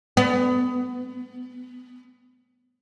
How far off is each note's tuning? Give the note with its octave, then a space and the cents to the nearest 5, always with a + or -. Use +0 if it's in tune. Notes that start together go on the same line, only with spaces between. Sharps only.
B3 +25